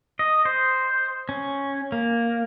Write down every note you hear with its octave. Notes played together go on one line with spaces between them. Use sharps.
D#5
C5
C#4
A#3